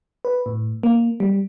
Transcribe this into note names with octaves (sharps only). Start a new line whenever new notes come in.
B4
A2
A#3
G3